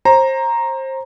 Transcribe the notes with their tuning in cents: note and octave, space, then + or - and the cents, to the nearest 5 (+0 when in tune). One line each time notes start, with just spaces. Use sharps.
C5 +25 A#5 +0